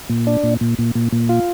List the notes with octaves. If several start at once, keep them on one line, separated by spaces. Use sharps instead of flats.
A#2
D4
A#2
A#2
A#2
A#2
A#2
F4